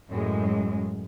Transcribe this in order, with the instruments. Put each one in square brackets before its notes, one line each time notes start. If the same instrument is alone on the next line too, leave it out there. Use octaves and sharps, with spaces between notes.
[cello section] F#2 A2 G#3